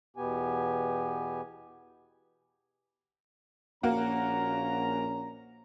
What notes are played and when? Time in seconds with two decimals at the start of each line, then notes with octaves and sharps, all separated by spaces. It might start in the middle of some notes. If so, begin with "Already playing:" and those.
0.17 E2 B2 B3 G4 G#5
3.83 A#1 A#3 C#4 F#4 A#5